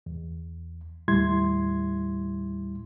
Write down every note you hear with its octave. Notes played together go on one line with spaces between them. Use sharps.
E2
D#2 A2 G3 E4 C6 G#6